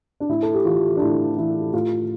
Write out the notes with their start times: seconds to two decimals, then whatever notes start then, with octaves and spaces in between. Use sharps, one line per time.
0.20 D4
0.29 A2 E4
0.43 A4
0.54 G4
0.65 E3 F4
0.97 D4
1.02 A2 E4
1.38 E3 E4
1.73 A2 F4